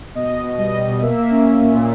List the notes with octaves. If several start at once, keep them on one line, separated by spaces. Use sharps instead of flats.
B2 D#5
B2
B2
G3 D#5
G3
B2
A#3 E5
A#3
C#4
C#4
A#2
A#2